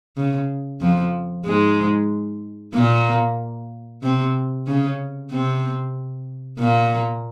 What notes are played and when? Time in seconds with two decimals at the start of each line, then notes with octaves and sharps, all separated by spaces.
0.17 C#3
0.81 F2 F3
1.46 G#2 G#3
2.74 A#2 A#3
4.02 C3 C4
4.67 C#3 C#4
5.31 C3 C4
6.59 A#2 A#3